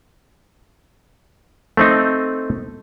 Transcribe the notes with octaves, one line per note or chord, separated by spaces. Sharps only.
A3 C4 D#4